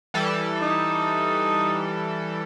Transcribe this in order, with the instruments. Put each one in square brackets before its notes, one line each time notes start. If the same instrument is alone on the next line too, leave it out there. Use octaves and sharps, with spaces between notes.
[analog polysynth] E3 G3 A4
[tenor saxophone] D#4